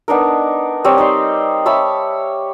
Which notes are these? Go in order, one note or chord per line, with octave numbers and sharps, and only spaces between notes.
B3 D4 D#4 A#4
G3 C4 C#5
D#4 D5 C6
C#5 E5 A5 B5